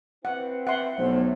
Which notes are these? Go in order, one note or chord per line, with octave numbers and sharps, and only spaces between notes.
C4 E4 B4 F#5
E5 F#5 C6
B1 E2 A2 C5